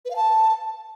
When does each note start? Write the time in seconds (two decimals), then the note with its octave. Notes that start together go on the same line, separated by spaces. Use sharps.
0.05 B4
0.10 F5
0.16 A5